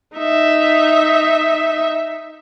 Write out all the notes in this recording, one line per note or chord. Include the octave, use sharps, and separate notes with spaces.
D#4 E5